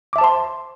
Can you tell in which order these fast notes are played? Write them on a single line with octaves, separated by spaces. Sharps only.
D6 E5 A5 C5 C6